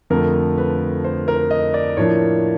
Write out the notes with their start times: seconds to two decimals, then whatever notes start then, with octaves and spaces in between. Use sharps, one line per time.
0.10 F2 D3 F3 A3 A#4
0.58 B4
1.04 C5
1.28 A#4
1.51 D#5
1.74 D5
1.97 A2 F3 A#3 D4 C#5